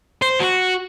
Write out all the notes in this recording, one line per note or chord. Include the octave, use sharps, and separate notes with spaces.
C5
F#4